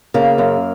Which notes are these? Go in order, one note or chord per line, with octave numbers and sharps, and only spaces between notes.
C#3 A#3
F#2